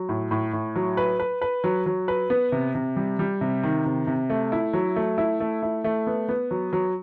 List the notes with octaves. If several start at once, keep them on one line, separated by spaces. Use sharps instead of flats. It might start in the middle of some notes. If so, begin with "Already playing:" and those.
Already playing: F#3
A2
A2
A2
F#3
B4
B4
B4
F#3
F#3
B4
B3
C3
C3
G3
G3
C3
D#3
C3
C3
A3
E4
F#3
A3
E4
A3
E4
A3
B3
B3
F#3
F#3